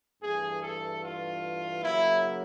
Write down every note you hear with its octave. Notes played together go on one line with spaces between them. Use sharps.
G2 E3 A3 G#4
A4
F4
C#3 F#3 A#3 E4